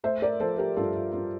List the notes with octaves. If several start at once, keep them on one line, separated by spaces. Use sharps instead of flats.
A3 C5 E5
A#4 D5
F3 A4 C5
G4 A#4
G2 F4 A4
F4
G2 F4